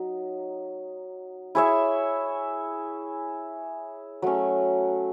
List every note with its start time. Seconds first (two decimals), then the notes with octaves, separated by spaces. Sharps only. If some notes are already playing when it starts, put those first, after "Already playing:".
Already playing: F#3 D#4
1.55 E4 G#4 C#5 E5
4.22 F#3 A3 C#4